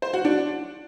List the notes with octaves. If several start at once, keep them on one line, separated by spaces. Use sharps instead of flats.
C5
F#4
D4